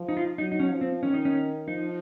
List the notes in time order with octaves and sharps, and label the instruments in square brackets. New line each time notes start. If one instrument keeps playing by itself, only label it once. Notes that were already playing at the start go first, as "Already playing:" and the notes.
Already playing: [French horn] F3
[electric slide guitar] D#4
F4
[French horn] F#3 [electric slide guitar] D#4
[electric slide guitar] D#4
C#4
[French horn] F3
[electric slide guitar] C4
[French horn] D#3 [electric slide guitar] C#4
[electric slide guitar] D#4
C#4
[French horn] F3 [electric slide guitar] D#4